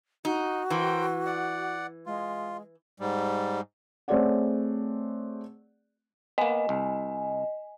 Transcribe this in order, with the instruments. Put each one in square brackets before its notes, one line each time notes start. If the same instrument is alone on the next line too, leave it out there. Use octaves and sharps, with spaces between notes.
[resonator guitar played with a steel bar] D#4 [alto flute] F#4
[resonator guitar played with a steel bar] E3 [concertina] A#4 C5 G5
[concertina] D5 F#5
[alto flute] G#3 [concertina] F4
[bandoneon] G#2 G3
[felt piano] A3 C4 G#4 C#5 D5 F#5
[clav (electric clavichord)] A#3 B3 [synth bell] D#5 G#5
[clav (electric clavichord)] C2